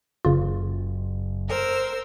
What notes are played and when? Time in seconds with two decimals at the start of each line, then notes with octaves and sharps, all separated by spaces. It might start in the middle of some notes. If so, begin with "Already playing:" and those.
0.25 F#1 C#3 F4
1.49 A#4 C5 E6